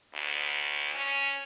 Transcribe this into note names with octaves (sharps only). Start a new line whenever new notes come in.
D2
C#4